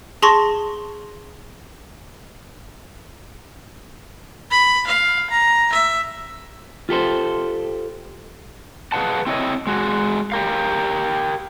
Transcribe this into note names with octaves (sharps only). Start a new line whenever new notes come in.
G#4 A5 C6 C#6 A#6
B5
F5
A#5
E5
F4 G4 A4 C5
G#4 B4 F5 F#5 A5
C4 E4 C#5 D#5
G#3 F#4
G4 A#4 F5